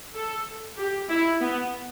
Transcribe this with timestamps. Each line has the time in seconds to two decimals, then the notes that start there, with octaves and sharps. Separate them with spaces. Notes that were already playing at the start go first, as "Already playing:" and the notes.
0.15 A4
0.77 G4
1.09 E4
1.40 B3